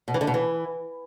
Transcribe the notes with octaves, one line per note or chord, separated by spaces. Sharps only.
B2
E3
D3
B2
E3